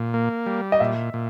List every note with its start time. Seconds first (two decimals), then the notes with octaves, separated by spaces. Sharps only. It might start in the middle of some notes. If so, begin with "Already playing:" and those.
Already playing: A#2
0.14 A#3
0.46 G3
0.72 D#5
0.80 A#2 E5
1.14 A#2